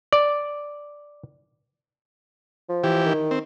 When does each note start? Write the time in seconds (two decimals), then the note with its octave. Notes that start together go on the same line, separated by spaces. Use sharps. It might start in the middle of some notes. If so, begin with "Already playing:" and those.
0.13 D5
2.69 F3
2.84 E3 G4
3.06 D#3
3.31 C4